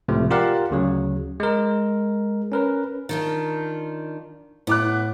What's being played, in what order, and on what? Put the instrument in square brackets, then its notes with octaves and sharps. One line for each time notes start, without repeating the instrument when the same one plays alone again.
[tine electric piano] C#2 A2 C3 F3 A3
F4 G4 A#4 D5 F5 F#5
D2 C#3 F#3
G#3 A#4
C#4 A#4 B4
[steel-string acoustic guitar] D#3 D4 F4
[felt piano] A2 D6 F#6 [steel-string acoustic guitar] B3